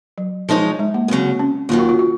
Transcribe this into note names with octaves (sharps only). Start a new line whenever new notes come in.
F#3
F3 G#3 D#4 A#4 C#5
G#3
A#3
D#2 C#3 F#3 C4
C#4
D#2 D#3 F#3 F4
F#4
F4
F#4